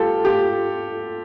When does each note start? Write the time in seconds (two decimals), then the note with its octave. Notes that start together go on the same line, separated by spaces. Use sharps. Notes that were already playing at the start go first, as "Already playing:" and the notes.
Already playing: G3 F4 G4 A4
0.25 F4 G4